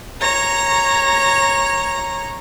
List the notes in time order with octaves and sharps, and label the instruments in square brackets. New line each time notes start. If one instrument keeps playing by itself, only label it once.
[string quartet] C#5 A#5 A#6